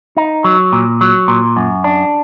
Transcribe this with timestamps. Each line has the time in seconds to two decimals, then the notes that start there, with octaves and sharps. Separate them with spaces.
0.17 D#4
0.44 F#3
0.73 A#2
1.01 F#3
1.28 A#2
1.57 F#2
1.84 D4